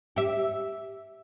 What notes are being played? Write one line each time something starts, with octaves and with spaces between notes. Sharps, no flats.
G4 E5